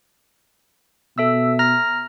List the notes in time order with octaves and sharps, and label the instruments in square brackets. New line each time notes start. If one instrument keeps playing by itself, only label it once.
[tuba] B2 [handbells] A4 E5 E6
[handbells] A#5 F6 A#6